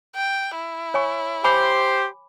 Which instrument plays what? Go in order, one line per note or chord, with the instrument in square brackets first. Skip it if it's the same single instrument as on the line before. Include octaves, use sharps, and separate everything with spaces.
[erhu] G5
E4
[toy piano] C#5 G#5 C#6
[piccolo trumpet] G4 [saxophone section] C5 [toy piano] G#5 B5 D6